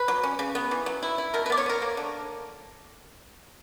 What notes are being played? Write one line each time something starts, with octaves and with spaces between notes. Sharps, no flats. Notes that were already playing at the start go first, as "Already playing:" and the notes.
Already playing: B4
F#3
C#4
C#3
B3
E3
F#3
E4
E4
B2 A#4
B4
B3 D5
C#5
B3 A#4
A#3
D3